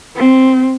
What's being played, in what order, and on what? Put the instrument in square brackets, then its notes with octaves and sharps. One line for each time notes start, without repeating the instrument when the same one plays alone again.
[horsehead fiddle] C4